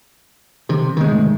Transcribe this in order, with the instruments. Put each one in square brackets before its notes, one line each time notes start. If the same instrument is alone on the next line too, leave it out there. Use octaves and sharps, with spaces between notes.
[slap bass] C3 [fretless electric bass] D#3 F3 C4
[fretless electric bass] D3 B3 C4 [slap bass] D#3 G#3
[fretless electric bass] G#2 C3 A3